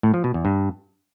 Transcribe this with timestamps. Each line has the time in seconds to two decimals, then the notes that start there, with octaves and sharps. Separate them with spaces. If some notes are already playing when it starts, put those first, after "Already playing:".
0.03 A2
0.14 F3
0.24 B2
0.34 E2
0.45 G2